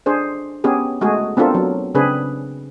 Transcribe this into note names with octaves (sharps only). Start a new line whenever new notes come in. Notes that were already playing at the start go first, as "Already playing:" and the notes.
D4 G#4 C5
B3 C#4 G4 G#4
G#3 A3 F#4 G#4
B3 C4 D4 F4 A4 A#4
F#3
C#3 C4 D4 G#4 B4